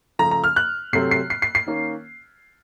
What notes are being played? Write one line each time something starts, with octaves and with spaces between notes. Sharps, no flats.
C#3 F3 A3 A#5
A#5
F6
F#6
C3 F#3 A3 C4 C7
C7
C7
C7
C7
D#3 A#3 C#4